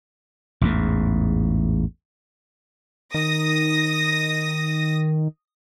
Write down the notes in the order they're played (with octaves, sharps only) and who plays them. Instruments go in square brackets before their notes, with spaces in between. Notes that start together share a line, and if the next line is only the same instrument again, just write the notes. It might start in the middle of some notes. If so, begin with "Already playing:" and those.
[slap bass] A1 E2 G#2
[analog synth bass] D#3 [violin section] D#6 A#6